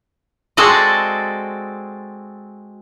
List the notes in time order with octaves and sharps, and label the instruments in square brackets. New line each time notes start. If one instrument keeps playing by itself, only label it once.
[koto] G#3 C4 F#4 A4 D5 D#5